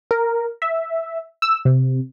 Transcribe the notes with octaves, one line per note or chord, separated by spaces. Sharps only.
A#4
E5
E6
C3